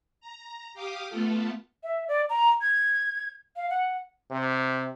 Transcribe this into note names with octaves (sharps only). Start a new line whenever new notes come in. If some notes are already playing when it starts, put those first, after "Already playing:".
A#5
G4 F5 D6 D#6
A3 B3 F4 A4
E5
D5
A#5
G#6
F5
F#5
C3